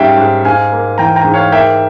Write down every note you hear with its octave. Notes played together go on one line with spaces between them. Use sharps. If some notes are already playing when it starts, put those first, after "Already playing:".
Already playing: G#2 G3 C#4 E5 F5 G5
G#2
G#2 F5 G#5
A#3
E3 G5 A#5
G5 A#5
G#2
C#5 F5
A#3 E5 G5